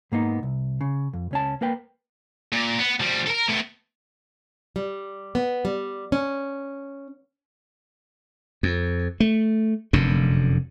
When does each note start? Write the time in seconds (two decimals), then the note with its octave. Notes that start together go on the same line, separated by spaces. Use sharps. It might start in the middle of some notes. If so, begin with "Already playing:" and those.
0.12 G#2 A#3 B3 D#4
0.43 C2
0.81 C#3
1.13 F2
1.31 C#2 C#4 A5
1.61 A#3 A#4 B4 G5
2.52 A#2
2.79 B3
3.00 F3 G3
3.27 A4 A#4
3.48 A2 B3
4.76 G3
5.35 B3
5.65 G3
6.12 C#4
8.63 F2
9.20 A3
9.93 F1 F#2 D3